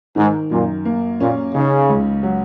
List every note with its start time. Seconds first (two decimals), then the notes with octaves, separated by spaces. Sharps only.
0.16 G#2 D#3
0.51 F#2 A#2
0.85 A#3
1.20 A#2 C#4
1.54 C#3 D#4
1.89 C#2
2.23 F#3